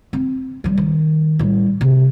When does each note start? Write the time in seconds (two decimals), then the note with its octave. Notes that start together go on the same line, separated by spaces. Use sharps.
0.13 C4
0.64 F3 G3
0.78 D#3
1.39 A2 G3
1.81 C3